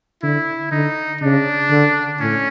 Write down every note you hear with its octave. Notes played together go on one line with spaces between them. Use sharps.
D3 E4
D3 D#4
C#3 D4
D3
A2 C#4